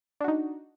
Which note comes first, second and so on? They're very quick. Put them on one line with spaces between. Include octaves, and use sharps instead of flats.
D4 F#4 D#4